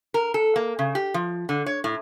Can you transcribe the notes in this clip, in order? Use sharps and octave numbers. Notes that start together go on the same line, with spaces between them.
A#4
A4
A#3
C#3
G4
F3
D3
C#5
A2